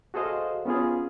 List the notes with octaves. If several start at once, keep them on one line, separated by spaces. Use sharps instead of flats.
F#4 G#4 A4 C5 D#5 F5
B3 C#4 F4 G#4